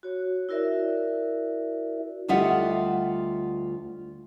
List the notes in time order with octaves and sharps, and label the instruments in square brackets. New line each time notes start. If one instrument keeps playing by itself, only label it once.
[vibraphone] F#4 C#5
E4 F#4 A#4 D5 E5
[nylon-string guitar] D2 G3 F4 D#5 E5 F#5